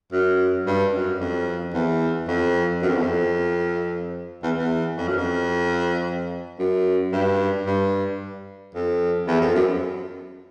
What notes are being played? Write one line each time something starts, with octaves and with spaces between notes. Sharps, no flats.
F#2
G2
F#2
F2
E2
F2
F#2
F2
E2
F2
E2
E2
F2
F#2
F2
F#2
G2
G2
F2
E2
F2
F#2